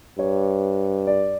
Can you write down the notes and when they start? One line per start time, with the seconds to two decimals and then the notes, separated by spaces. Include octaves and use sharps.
0.18 G2 C#5
1.07 D5